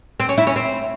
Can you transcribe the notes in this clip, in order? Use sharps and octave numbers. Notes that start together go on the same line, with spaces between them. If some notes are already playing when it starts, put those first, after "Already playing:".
C4
C#4
E4
C#4
C4